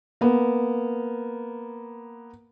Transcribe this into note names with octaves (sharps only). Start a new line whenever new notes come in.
A#3 B3